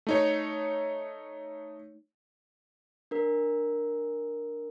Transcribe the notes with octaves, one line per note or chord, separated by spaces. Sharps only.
A3 D#4 C#5
D4 A#4